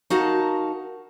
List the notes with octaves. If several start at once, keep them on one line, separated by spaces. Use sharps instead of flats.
D#4 F#4 A#4 F5 A5